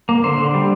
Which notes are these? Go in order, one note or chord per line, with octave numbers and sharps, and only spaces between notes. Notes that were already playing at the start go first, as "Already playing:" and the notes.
A#3
D3 C5
D3
G3